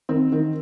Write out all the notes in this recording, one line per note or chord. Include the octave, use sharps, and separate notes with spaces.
D#3 C4
D#3